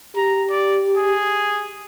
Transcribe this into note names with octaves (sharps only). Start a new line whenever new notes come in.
G4 A#5
D5
G#4